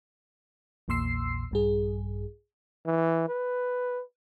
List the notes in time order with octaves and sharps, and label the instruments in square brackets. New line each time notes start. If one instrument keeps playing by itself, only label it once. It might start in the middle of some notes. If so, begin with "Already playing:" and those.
[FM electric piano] A#1 E2 A#2 C6 E6 C7
A#1 G2 G#4
[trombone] E3
B4